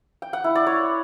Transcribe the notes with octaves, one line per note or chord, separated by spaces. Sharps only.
G5
F#5
E4
D5
C#5